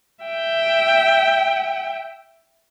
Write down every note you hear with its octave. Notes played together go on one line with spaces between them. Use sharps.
E5 G5